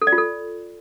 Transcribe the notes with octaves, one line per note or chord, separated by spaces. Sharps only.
A4
D5
F4
A4